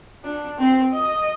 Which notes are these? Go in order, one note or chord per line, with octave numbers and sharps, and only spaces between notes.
D4
C4 C5
D#5